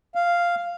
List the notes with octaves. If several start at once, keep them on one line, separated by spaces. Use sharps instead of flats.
F5